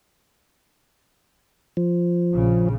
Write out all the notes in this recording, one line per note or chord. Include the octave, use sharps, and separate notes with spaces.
F3
A#1 C#3